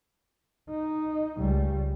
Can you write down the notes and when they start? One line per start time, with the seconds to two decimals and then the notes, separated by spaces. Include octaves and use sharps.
0.70 D#4
1.38 C#2 G3